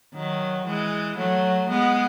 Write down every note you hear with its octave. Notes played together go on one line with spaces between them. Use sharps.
D#3 F#3
E3 G#3
F#3 A3
G#3 B3